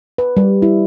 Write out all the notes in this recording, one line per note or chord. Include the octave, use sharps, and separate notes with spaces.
B4
G3
E4